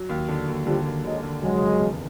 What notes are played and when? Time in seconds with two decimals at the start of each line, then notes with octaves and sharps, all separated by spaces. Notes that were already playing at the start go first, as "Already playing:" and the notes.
Already playing: F#3
0.09 D#2
0.28 D3
0.47 D#2
0.66 D3 F3 G3
0.85 D#2
1.04 D3 F#3 G#3
1.23 D3
1.42 F1 F#3 G#3
1.61 C#3
1.80 E2